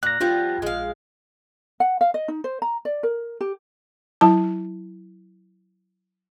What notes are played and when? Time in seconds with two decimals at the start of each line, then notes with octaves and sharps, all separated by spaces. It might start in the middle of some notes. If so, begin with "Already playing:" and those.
0.03 A#2 F#6 A#6
0.20 F3 G3 B3 F4
0.62 A#1 G#3 F5
1.80 F#5
2.01 F5
2.14 D#5
2.28 D#4
2.44 C5
2.62 A#5
2.85 D5
3.03 A#4
3.41 G4
4.21 F#3 E4 A5